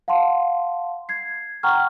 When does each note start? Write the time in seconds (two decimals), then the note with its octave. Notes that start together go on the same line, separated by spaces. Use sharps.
0.08 F5 F#5 A5 C6
1.09 G#6 C7
1.63 F#5 G5 A#5 C#6 F6